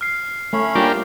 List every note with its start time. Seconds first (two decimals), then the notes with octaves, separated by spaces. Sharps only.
0.01 F6 C7
0.53 A3 C#4 C#5 B5
0.75 G3 A#3 D4 F4 G4 G5